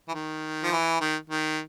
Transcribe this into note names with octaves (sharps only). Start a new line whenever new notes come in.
E3
D#3
F3
E3
D#3
D#3